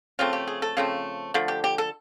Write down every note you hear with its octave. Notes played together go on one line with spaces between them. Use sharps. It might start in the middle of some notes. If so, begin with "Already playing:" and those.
C#3 F3 A3 C4 F4
G4
G#4
A4
C#3 F3 A3 C4
D3 F3 A3
G4
G4
A4